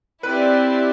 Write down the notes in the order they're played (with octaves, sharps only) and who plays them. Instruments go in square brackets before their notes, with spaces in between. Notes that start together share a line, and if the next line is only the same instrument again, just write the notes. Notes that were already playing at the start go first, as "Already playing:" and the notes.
[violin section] C4 E4 G4 D5 [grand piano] B4